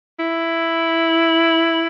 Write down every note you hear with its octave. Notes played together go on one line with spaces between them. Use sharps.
E4